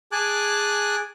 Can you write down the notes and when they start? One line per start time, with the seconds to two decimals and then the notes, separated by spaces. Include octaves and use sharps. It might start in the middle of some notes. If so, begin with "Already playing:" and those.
0.12 G#4 G#5 A5 D6 F#6